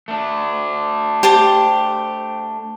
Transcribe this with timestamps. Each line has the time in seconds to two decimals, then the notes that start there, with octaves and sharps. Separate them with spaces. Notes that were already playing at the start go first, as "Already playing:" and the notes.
0.08 A3 D4
1.23 G4 C5 A5